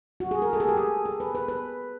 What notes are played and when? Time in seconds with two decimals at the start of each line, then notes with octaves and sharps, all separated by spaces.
0.20 F#4
0.31 G#4
0.42 A#4
0.53 A4
0.60 G#4
0.69 G4
0.76 G#4
1.05 A4
1.20 B4
1.35 B4
1.48 B4